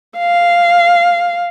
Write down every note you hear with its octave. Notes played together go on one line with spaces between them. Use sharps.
F5